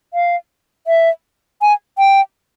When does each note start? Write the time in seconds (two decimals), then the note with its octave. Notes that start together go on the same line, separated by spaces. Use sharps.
0.14 F5
0.87 E5
1.62 G#5
1.98 G5